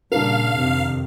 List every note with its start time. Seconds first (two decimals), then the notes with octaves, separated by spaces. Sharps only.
0.12 A#2 C#3 G3 D4 A#4 F5
0.57 F2 C3 D#3